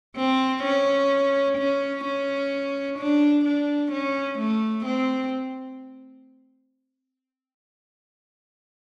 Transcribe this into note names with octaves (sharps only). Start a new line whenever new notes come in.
C4
C#4
C#4
C#4
D4
D4
C#4
A3
C4